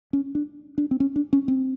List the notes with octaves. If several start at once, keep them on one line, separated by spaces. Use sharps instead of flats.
C#4
D4
D4
C4
C#4
D4
C#4
C4